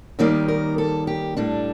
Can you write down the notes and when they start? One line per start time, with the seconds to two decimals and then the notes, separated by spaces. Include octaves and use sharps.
0.19 D#2 D#3 G3 A#3 D#4 D5
0.48 A#4
0.78 A4
1.07 G4
1.37 A2 G3 D4 A4